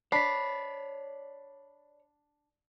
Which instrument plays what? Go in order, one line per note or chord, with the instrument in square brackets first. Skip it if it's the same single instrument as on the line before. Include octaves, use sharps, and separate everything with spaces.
[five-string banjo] D4 [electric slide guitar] C#5 D5 [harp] B5 [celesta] B6 C7